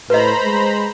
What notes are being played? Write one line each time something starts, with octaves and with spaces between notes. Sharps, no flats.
A2 B4 C5 D#5 A#5 B5
G#3